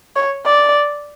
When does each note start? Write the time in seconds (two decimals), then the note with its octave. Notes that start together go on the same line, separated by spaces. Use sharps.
0.16 C#5
0.46 D5